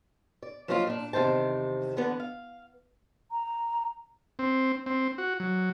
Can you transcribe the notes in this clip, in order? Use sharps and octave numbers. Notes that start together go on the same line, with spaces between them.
D5
F3 F#3 A#3 B3 D#4 F4
A#2 D4
E2 C3 D#3 C5 A5
D3 E3 B3 B4
F5
A#5
C4
C4
F#4
F#3